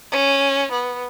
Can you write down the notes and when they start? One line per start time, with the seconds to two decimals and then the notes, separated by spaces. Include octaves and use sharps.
0.12 C#4
0.72 B3